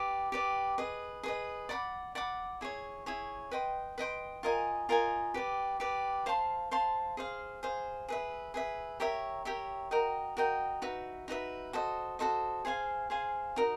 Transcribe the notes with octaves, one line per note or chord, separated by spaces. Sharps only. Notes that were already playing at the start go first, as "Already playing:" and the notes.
Already playing: G4 B4 D5
G4 B4 D5
G#4 B4 D#5
G#4 B4 D#5
D5 F#5 B5 D6
D5 F#5 B5 D6
E4 G#4 C#5
E4 G#4 C#5
B4 D#5 G5 C6
B4 D#5 G5 C6
F4 A#4 D#5 G#5
F4 A#4 D#5 G#5
G4 B4 D5
G4 B4 D5
C5 F5 A5 C6
C5 F5 A5 C6
G#4 C5 F5
G#4 C5 F5
G#4 B4 E5
G#4 B4 E5
G4 A#4 C#5 E5
G4 A#4 C#5 E5
F#4 A#4 D#5 G5
F#4 A#4 D#5 G5
D#4 F#4 B4 E5
D#4 F#4 B4 E5
F#4 A4 C5 D#5
F#4 A4 C5 D#5
G#4 C5 F5 G#5
G#4 C5 F5 G#5
D#4 F#4 A#4 D#5